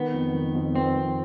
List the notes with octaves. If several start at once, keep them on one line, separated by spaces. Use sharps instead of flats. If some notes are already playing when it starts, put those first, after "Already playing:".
Already playing: D#3 B3
F2
D#3
F2
F2 C4
F2